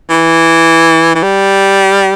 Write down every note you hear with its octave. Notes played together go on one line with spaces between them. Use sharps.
E3
E3
G3